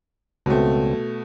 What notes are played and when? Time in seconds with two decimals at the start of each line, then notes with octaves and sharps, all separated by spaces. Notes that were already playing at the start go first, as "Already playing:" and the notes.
0.46 C#2 B2 A3 C4